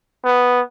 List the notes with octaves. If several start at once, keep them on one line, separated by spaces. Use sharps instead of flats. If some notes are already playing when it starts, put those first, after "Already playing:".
B3